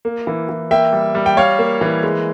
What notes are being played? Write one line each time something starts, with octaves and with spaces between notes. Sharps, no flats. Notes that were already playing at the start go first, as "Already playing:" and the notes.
A#3
E3
E3
A#3 E5 G5
G3
G3
G5
G3 C#5 F5
A#3
E3
G#3